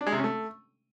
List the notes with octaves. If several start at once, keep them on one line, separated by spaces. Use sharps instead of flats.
D4
G#3
C3
C#4
A3